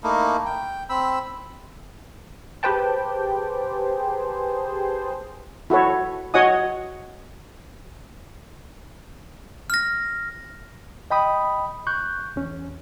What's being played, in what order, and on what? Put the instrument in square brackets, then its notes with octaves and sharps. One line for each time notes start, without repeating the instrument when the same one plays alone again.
[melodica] A3 A#3 D#4 E4
G5
C4 B5 E6
[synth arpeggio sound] G4 G#4 B4 C5 G5 A5
[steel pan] E4 F#4 A4 C#5
F#4 C#5 D#5 F#5 G#5 D#6
[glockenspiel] F6 A#6
[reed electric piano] D#5 G5 B5 D#6
C#6 F#6 G6
E2 C#4